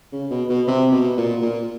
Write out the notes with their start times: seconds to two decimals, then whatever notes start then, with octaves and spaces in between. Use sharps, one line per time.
0.12 C#3
0.30 B2
0.49 B2
0.67 C3
0.92 B2
1.17 A#2
1.42 A#2